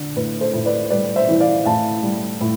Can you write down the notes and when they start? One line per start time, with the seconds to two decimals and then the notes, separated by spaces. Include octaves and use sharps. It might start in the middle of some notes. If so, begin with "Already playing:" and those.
Already playing: D3
0.16 A2 B4
0.41 A4 C5
0.53 A2
0.66 B4 D5
0.90 G3 B4 D5
1.16 C5 E5
1.28 E3
1.40 D5 F5
1.65 A2 F5 A5
2.03 G3
2.41 A2